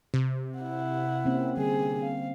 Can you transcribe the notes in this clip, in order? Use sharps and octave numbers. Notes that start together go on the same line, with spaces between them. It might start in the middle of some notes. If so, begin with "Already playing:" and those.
C3
E4 F#5
A#3 C4 C#4
D3 G3 G#4
F5